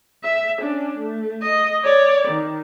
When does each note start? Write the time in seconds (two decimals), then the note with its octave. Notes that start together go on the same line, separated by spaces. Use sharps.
0.24 E5
0.61 C#4 D4
0.99 A3
1.42 D#5
1.83 C#5 D5
2.28 D#3